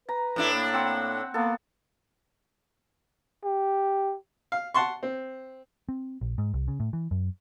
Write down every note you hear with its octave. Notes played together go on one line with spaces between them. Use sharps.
B4 A#5
A2 D4 E4
A#3
C4 F#5 E6
A#3 B3 A4
G4
F5
F#5 A5 C6 C#6
C4
C4
A#1
G#2
C2
C#3
A2
E3
F#2